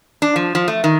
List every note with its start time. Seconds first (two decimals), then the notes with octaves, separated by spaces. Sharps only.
0.22 D4
0.36 F3
0.55 F3
0.68 A3
0.84 D#3